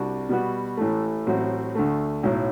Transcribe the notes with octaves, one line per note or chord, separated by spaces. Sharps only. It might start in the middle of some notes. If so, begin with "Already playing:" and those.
Already playing: C2 C3 G3 D4 F#4
B2 G3 B3 F#4
A1 A2 E3 A3
A1 A2 F#3 C4 F#4
D2 D3 A3
B1 A2 F#3